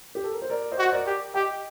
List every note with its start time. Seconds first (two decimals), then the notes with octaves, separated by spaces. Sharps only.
0.15 G4
0.24 A4
0.32 A#4
0.42 C5
0.50 A#4 D5
0.71 C5 D#5
0.78 F#4
0.86 C5
0.92 A#4 D5
1.06 G4
1.34 G4 D#5 G5